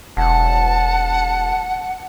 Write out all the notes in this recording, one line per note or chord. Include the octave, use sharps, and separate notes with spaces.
E1 F#5 A5